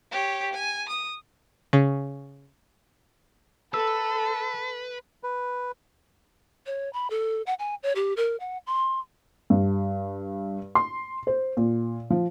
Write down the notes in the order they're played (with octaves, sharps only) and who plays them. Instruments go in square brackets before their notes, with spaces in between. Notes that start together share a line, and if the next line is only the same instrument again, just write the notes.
[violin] G4 C#5
G#5
D#6
[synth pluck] C#3
[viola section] A4 [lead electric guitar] B4 [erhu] A5 [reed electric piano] E6
[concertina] B4
[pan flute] C#5
B5
A4
F#5
G#5
C#5
G4
A#4
F#5
C6
[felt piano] G2
C6
C5
A#2
F3